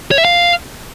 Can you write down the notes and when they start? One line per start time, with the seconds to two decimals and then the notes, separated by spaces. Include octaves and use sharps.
0.11 C#5
0.18 E5
0.25 F5